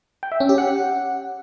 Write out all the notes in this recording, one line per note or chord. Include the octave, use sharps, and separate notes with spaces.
G5
E5
C#4
G4
F#5